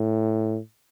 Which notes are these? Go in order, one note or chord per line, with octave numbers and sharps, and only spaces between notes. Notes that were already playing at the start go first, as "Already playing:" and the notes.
Already playing: A2